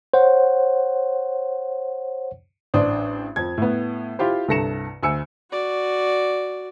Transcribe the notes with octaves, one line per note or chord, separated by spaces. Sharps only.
C5 C#5 F#5
A1 D4 C5 D#6
F2 G#6
A2 B3
E4 F4 G4 C5
C2 G2 A4 A#6 C#7 E7
D2 G#5 E6 C#7
F#4 D5